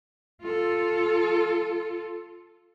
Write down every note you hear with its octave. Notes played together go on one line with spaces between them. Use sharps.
F4 A4